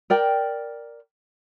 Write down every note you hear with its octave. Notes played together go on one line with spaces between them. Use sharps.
A#4 D5 G5